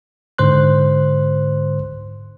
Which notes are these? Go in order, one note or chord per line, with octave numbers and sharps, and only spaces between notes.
G#2 D3 C5 C6 F#6